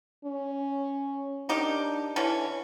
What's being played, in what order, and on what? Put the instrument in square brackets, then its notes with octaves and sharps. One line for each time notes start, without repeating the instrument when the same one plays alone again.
[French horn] C#4
[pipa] D#3 D#4 G4 [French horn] D4
[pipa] D3 E3 C#4